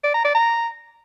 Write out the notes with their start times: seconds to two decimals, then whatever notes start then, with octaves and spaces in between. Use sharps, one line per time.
0.04 D5
0.14 A#5
0.24 D5
0.35 A#5